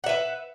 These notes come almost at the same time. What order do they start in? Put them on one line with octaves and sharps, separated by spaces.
F#5 E5 B4